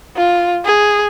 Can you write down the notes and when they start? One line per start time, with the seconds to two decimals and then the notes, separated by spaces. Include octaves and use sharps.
0.16 F4
0.65 G#4